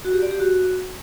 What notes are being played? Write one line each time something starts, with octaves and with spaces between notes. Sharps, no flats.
F#4
G4
D5
G4
F#4